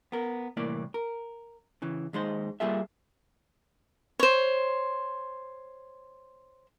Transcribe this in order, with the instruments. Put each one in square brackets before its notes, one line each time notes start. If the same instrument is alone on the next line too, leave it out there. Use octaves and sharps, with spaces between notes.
[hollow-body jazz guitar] B3 A#4
C2 A2 E3 A#3 D5
A#4
C#3 E3
D#2 G#3 D#4 C5
G3 A#3 F4 G#4 A4 E5
[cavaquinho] C5 C#5